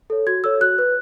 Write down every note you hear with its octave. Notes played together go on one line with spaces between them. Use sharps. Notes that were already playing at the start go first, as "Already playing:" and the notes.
A4 C#5
F#4 G#6
A4 C#5 E6
F#4 F#6
B4